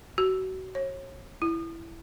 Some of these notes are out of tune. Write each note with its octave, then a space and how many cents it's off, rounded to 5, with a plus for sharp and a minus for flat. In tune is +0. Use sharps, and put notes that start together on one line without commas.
F#4 +30
C#5 -35
E4 +10